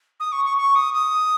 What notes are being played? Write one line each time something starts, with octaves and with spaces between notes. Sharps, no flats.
D#6
C#6
C#6
C#6
D#6
D#6